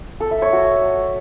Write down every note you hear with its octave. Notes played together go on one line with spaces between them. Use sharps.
A4
E5
C#5
F#4